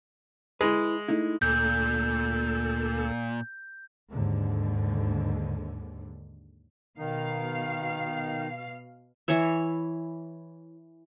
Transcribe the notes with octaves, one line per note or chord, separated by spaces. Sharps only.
G#3 E4 B4
A3 D#4 E4
D2 A#2 A4 G6
D#2 G#2 D3
B2 D#3 D#4 F5
E3 E4 C#5 E5